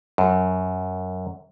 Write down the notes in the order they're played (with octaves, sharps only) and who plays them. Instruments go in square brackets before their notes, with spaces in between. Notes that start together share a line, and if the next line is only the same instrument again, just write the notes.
[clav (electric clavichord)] F#2